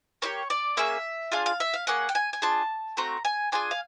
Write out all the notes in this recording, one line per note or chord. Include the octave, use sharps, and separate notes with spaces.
A#3 D#4 G4 C#5
D5
A#3 C#4 G#4 E5
D4 F4 G#4 F5
F5
E5
F5
A#3 C#4 G#4 F#5
G5
G#5
G#5
D4 F4 G#4 A5
A3 C4 F#4 A#5
G#5
D4 F4 G#4 G#5
F5